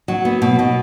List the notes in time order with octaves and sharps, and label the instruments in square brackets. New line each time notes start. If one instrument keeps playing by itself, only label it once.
[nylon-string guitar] F#3
B3
B2
B2